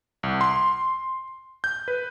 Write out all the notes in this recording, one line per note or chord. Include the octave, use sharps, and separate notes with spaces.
C2
C6
G6
B4